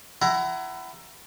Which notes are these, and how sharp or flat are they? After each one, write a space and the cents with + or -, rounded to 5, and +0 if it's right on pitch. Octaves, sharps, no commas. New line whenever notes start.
E4 +25 F#5 +30 A#5 +0